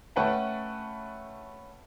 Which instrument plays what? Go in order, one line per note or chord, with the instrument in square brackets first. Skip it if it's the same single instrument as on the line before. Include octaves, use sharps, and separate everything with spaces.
[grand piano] A3 C#4 B4 F#5 G5 A5